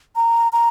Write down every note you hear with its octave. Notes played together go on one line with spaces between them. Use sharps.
A#5
A#5